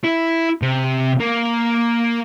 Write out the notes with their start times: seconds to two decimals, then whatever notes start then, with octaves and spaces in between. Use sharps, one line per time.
0.04 E4
0.62 C3
1.20 A#3